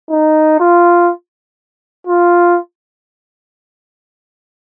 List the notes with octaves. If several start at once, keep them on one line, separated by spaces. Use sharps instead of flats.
D#4
F4
F4